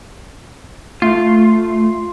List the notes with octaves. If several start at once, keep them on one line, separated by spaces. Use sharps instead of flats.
A3 F4